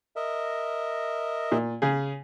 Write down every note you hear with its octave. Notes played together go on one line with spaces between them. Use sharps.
A#4 D#5 E5
A#2
C#3 G#4